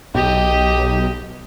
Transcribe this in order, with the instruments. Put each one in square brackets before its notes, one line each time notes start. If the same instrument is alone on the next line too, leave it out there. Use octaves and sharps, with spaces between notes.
[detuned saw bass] B1 [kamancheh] G4 D#5